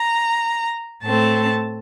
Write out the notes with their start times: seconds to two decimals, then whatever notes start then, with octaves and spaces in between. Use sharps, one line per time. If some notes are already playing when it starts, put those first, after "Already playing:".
Already playing: A#5
1.03 A2 A3 C4 A5